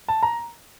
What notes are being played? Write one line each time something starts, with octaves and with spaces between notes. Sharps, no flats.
A5
A#5